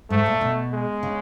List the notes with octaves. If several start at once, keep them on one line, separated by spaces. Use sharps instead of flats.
G#2 A3
A#2
B2
G#3
C#3